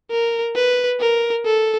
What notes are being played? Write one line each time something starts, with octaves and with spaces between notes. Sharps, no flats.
A#4
B4
A#4
A4